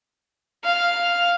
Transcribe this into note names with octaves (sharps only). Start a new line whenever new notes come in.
F5